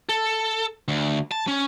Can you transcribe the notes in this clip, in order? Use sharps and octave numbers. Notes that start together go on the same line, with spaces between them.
A4
D2
A5
C#4